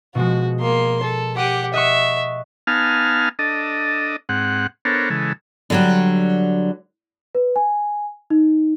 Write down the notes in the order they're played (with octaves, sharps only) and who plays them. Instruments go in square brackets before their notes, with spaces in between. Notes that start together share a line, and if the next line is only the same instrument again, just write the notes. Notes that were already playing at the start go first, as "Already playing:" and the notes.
[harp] B2 F3 G#3 [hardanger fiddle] F#4
[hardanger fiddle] A#3 C6
A4
[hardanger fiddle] G4 F#5 [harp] D6 D7 D#7
[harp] D#5 F#5 C#6 [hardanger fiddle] E5
[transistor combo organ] B3 D#4 F5 G#5 A5 F6
D4 A4 D#5
G#2 C4 F#5
B3 D4 A4 A#4 C5 C#5
C#3 E3 G#3 A4
[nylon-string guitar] D3 F#3 G3
[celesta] B4
G#5
D#4